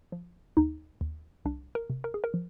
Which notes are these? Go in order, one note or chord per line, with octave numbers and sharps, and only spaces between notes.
F3
D#2 D#4
D#2
C2 D4
A#4
C3
A#4
G#4
A#4
F3